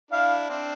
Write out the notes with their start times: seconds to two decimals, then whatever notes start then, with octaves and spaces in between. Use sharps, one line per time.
0.11 D4 E4 F5
0.50 C4 D4